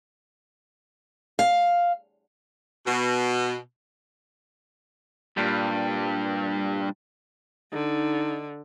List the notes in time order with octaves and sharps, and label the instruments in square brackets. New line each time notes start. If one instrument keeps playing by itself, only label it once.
[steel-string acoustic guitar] F5
[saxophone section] B2
[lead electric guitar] G2 [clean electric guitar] A#2 G3
[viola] D3 [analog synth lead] D#4